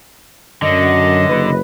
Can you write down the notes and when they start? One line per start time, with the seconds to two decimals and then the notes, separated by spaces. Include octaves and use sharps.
0.62 F#2 D3 D#5
1.28 F#1 B4